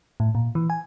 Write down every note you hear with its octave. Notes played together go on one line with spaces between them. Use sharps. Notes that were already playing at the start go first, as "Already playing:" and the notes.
A2
A#2
E3
G#5